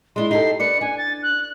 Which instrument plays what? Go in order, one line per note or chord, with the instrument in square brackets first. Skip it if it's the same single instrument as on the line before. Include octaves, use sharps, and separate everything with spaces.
[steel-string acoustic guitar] G#3 D4 E4 [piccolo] C6
[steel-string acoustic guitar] D#4 G4 A4 [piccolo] C7
[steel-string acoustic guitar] D4 B4 D5 [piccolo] C#7
[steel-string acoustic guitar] D4 [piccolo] G#5
[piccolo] A6
F#6